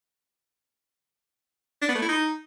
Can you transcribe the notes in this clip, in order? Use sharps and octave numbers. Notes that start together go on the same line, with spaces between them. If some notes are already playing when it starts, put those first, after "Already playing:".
D4
B3
A3
E4
D#4